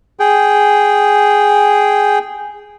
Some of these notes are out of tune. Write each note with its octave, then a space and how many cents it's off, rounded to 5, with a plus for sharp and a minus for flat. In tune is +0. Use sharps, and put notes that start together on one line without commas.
G#4 +0 G5 -5